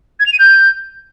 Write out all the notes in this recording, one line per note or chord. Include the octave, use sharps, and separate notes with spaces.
G#6
F7
D#7
G6